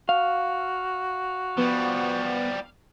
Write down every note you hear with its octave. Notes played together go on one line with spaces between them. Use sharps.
F#4 F5
F3 G3 B3